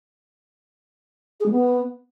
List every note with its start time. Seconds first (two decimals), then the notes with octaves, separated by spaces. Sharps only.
1.40 G#4
1.45 G#3
1.51 B3